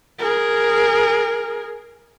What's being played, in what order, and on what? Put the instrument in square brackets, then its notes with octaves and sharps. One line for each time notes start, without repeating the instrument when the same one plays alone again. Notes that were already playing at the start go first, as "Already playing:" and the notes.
[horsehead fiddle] G#4 A#4